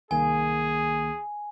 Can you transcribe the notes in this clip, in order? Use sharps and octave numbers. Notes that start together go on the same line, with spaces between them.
C2 D#3 A#3 G#4 G#5